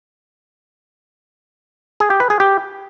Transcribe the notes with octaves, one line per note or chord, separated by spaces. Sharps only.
G#4
G4
B4
G#4
G4